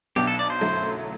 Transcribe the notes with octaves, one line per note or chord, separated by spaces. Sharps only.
B1 B2 F#3 B3 D4 G4
A4
D5
C5
G1 F#2 F#3 A3 E4